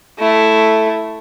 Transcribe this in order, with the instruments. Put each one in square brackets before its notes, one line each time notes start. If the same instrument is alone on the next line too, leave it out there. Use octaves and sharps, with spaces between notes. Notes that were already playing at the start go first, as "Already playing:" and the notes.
[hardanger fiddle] A3 E4